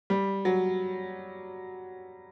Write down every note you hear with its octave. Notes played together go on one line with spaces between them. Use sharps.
G3
F#3